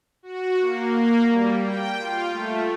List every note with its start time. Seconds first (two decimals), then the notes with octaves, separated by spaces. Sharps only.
0.23 F#4
0.60 A#3
1.29 G3
1.62 G5
1.98 F4
2.31 A3